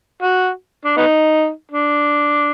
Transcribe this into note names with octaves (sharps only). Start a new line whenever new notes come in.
F#4
D4
B3 D#4
D4